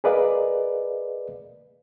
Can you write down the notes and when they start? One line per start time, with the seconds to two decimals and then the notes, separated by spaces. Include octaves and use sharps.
0.04 G#4 A#4 B4 D5 D#5 F5